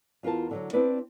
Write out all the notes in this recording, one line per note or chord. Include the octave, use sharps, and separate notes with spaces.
E2 F4 F#4 A#4 A5
D3 F3 F#3
C4 D4 E4 B4 D5